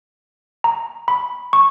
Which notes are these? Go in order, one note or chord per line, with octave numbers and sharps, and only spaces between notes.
A#5
B5
C#6